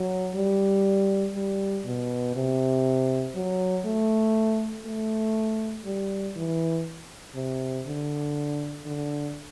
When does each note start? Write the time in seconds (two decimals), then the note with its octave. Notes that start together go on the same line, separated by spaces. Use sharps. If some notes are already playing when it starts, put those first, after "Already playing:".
Already playing: F#3
0.35 G3
1.34 G3
1.86 B2
2.36 C3
3.35 F#3
3.85 A3
4.86 A3
5.86 G3
6.36 E3
7.36 C3
7.87 D3
8.87 D3